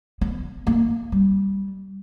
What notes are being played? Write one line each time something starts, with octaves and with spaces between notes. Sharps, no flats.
B3
A#3
G3